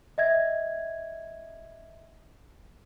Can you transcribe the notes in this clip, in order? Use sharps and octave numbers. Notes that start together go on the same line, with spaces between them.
D#5 E5 G#6